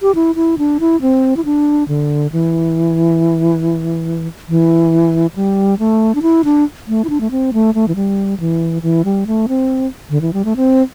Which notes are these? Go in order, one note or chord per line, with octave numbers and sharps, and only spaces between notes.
G4
E4
E4
D4
E4
C4
E4
D4
D3
E3
E3
G3
A3
D4
E4
D4
A3
E4
D4
A3
C4
A3
A3
E3
G3
E3
E3
G3
A3
C4
D3
E3
G3
A3
C4